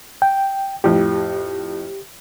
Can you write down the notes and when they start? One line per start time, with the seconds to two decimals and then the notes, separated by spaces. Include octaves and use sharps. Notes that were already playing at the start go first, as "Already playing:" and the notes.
0.22 G5
0.84 F2 A2 G4